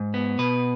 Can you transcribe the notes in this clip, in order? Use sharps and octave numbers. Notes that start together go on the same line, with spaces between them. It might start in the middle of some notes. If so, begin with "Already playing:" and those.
Already playing: G#2
B3
B2 B4